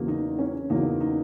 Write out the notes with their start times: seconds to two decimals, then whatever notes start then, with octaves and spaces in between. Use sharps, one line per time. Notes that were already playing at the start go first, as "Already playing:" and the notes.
Already playing: E2 C#3 F#3 A#3
0.08 D#4
0.39 C#4
0.70 E2 C#3 F#3 A#3 D#4
1.01 D#4